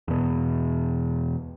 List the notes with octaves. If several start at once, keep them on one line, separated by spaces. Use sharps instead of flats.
E2 B2